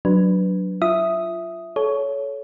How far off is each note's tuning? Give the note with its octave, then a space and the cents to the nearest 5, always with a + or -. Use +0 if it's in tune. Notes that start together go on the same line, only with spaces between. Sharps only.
F#3 +0 D4 +0 B4 +0
F4 -15 E5 +0 D#6 +0
A4 -30 C#5 +10